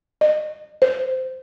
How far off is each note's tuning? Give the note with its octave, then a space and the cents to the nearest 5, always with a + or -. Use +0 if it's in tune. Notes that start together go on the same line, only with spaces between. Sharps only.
D#5 -30
C5 -15